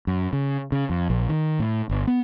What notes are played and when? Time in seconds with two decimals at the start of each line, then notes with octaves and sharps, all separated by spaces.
0.07 F#2
0.33 C#3
0.72 C#3
0.90 F2
1.10 A#1
1.29 D#3
1.59 A2
1.89 G1
2.07 B3